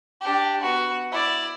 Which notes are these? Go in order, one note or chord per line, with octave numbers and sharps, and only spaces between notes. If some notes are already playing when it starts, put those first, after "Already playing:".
D4 G4
B3 F#4
E4 D5